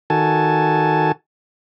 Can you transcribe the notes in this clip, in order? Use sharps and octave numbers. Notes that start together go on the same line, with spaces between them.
D#3 F#4 A4 G#5 A5